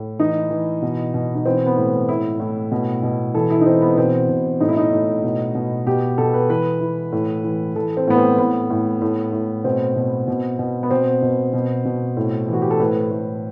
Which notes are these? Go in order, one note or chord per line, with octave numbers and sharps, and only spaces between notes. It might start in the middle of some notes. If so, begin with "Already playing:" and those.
Already playing: A2
E3 D#4
E3
B2
B2
D#4
E3 C4
B3
A2
A2 E4
A2
B2
B2
E3 A4
E4
D#4
E3 C4
B3
B2 C4
B2
A2 D#4
E4
D#4
A2
B2
B2
B2 G4
B2 A4
B4
E3 B4
E3
A2
E3
E3 A4
C4
A2 B3
C4
A2 B3
A2
A2
A2
B2 C4
B2
B2
B2
B3
B2 C4
B2
B2
B2
A2
E3 F#4
G4
A4
A2 B4
A2